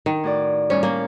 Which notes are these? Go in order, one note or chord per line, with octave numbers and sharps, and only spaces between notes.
D#3
A2 F#4 D5
A2 D#3 G3 C#4
A#3